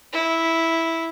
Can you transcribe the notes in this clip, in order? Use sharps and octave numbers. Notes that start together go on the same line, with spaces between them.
E4